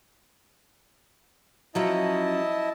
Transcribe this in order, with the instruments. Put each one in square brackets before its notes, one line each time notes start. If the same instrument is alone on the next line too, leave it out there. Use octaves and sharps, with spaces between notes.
[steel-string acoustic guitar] F3 F#3 C#4 [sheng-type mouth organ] E4 D#5 A5